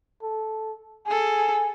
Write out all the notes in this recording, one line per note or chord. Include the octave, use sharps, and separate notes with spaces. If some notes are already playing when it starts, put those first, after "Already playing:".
A4
G#4 A4 G#5